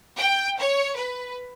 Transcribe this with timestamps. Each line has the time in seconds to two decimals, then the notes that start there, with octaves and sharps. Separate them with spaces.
0.18 G5
0.59 C#5
0.95 B4